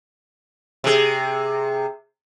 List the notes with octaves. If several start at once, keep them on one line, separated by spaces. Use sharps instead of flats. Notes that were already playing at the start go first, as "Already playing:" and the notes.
C3 G#4